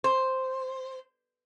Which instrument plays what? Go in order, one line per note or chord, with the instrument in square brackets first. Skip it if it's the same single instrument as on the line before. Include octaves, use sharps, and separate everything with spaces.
[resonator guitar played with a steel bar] C5